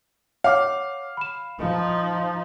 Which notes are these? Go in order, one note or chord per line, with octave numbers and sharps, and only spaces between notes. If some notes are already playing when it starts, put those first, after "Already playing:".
C#5 F5 F#5 D6
B5 E7
F3 D#4